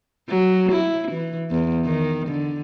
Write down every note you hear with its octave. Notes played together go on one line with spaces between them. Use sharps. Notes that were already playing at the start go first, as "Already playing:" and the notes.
F#3
E4
E3
E2
D#3
D3